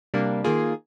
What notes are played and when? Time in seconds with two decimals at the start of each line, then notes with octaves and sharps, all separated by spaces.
0.14 C3 G3 A#3 D4
0.44 D#3 A#3 F4 G#4